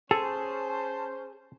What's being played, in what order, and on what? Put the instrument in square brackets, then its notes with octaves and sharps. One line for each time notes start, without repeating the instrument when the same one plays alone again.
[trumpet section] C#4 C5 [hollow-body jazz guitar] G#4 [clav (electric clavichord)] A4 [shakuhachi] A5